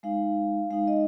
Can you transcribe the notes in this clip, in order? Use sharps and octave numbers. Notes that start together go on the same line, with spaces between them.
G#3 D#4 F5
G#3 D#4 F5
D#5